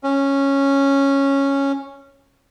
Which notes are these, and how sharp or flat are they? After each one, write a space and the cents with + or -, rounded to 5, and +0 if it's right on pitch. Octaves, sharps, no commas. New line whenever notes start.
C#4 -10